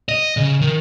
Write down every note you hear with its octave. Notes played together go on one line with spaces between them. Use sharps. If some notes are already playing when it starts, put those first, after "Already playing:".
D#5
C#3
D#3